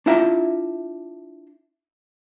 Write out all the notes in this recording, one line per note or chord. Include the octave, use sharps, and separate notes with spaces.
D4 E4 F4 E5 G5 A#5